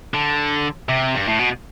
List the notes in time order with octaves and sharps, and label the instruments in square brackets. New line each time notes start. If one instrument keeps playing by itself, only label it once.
[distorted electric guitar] D3
C3
G2
A2
B2